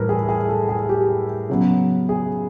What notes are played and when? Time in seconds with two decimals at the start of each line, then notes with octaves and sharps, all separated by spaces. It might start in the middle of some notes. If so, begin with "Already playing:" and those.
Already playing: A2 E3 G3 A#4 B4
0.09 G#4
0.29 G#4
0.49 A4
0.69 G#4
0.89 G4
1.49 C#3 F#3 B3
2.09 G#4